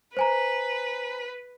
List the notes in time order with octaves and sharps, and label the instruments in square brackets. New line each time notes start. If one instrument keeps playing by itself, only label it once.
[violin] B4 [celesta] C5 G#5 A#5